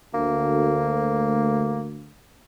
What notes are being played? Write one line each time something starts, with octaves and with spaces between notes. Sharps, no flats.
D2 A#3